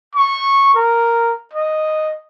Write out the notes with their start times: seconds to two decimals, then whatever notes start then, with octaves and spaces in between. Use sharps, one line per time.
0.16 C#6
0.75 A#4
1.53 D#5